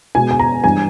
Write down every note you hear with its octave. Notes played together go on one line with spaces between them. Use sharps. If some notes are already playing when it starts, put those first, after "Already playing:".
B2 G#3 G#5
G#5
A#5
G2 E3 G3 G#5